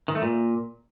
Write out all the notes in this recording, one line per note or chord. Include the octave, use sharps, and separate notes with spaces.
D#3
A3
A#2